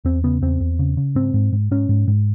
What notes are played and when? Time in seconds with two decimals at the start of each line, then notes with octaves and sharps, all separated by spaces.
0.05 E2 C4
0.24 C#3 B3
0.42 E2 C4
0.60 E2
0.79 C#3
0.97 C#3
1.15 G#2 C4
1.34 G#2
1.52 G#2
1.71 G#2 C#4
1.89 G#2
2.08 G#2